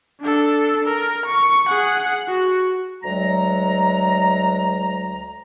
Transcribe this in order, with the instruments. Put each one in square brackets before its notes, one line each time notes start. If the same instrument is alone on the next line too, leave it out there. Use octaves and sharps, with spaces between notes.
[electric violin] D4 A4
A#4
C#6
G#4 F#5
F#4
[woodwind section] D2 F#3 G#3 A#5